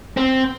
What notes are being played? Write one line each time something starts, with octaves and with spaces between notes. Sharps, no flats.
C4